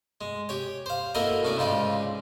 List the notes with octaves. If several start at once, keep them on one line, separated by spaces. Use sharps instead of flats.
G#3
G4 C#5
C5 F5
A#3 E4 F#4 A4 A#4 D#5
A2 C#4 D5
C#2 G#2 C#3 D#4 F4 D5